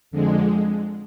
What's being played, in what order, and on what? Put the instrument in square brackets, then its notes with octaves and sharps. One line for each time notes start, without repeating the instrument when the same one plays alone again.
[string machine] F2 D3 G#3